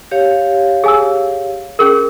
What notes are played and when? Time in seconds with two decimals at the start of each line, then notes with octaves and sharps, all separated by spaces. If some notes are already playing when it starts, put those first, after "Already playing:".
0.11 G4 C#5 F5
0.84 G#4 G#5 E6
1.79 C#4 G#4 A#4